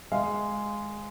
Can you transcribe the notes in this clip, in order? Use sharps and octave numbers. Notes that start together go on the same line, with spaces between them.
G#3 F5